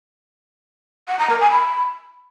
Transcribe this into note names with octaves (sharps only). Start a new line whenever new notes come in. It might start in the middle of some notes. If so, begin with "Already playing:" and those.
F#5
A#5
A#4
G#5
B5